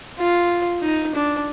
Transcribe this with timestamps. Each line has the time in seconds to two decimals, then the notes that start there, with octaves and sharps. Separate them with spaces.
0.19 F4
0.83 D#4
1.15 D4